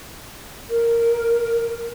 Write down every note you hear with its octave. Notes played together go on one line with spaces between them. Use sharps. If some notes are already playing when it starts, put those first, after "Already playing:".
A#4